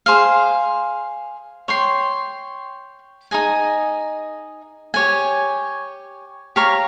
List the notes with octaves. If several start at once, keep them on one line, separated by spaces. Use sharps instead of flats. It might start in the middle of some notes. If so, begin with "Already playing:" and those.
G#4 C5 F5
C#5 G5 C6
D#4 G#4 D#5 G#5
G4 C#5 G#5
G4 C#5 F5 A#5